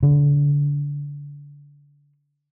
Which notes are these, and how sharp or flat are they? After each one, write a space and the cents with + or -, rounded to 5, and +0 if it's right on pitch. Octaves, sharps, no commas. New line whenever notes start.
D3 -30